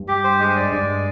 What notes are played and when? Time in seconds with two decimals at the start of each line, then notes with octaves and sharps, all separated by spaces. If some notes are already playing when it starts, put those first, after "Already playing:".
Already playing: G2
0.08 G4
0.24 C5
0.40 G#3
0.56 D5
0.72 G2 D5
0.88 G#3